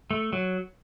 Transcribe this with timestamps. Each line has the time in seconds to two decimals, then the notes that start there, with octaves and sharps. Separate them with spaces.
0.11 A3
0.33 F#3